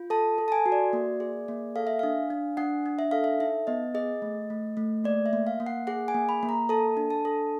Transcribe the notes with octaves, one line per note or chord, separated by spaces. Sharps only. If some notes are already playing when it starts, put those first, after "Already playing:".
Already playing: F4
A4 A5
A4
A5
G#5
F#4
D5
A#3
G#4
A#3
A4 F5
E5
D4 F5
D4
D4 F#5
D4
E5
A4 F5
E5
D#4 E5
B3 D#5
G#4 D#5
A3
A3
A3
A#3 D5
E5
A#3
F5
A#3
F#5
G#4 F#5
G#5
A#3
B5
A#3
A#5
A4 A5
D4
A5
A4